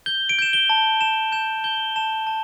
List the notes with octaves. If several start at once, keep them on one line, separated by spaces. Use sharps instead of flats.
G6 G7
D7
G6 E7
G7
A5
A5 E7
G6 E7
G6 G7
A5 E7
A5